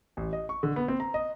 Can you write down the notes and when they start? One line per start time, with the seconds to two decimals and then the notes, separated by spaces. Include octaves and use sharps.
0.17 A1
0.33 D#5
0.49 C#6
0.63 D3
0.76 B3
0.88 C4
1.00 A#5
1.14 D#5